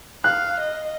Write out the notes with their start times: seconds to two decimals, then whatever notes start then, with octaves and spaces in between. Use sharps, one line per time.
0.24 F5 F#6
0.60 D#5